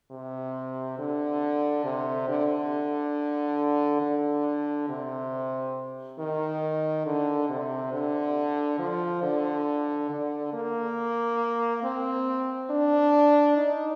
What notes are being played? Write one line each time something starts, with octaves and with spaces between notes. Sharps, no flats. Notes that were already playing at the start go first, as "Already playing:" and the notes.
C3
D3
C3
D3
D3
C3
D#3
D3
C3
D3
F3
D3
D3
A#3
C4
D4
D#4